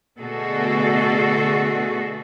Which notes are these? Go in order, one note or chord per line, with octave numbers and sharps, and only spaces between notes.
B2 D3 A3 F#4 G#4 A4